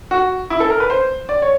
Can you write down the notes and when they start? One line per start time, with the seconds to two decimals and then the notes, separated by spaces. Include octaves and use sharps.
0.11 F#4
0.50 E4
0.60 A4
0.70 A#4
0.80 B4
0.90 C5
1.29 D5
1.42 C#5